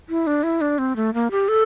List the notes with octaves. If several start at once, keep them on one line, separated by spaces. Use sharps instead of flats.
E4
D4
E4
D4
C4
A3
A#3
G4
A4